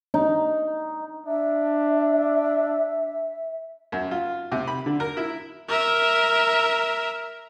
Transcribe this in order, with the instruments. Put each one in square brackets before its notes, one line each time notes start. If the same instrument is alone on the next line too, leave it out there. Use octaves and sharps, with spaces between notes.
[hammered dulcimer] D#4
[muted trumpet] D4 [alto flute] E5
[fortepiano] F#2
F4
C3
B5
D3
A#4
E4
[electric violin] A#4 E5